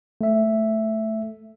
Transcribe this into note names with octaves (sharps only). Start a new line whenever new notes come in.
A3 E5